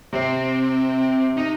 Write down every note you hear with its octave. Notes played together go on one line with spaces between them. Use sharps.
C3 C4
D#4